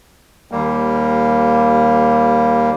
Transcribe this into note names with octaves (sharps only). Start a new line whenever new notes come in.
D#2 G3 A#3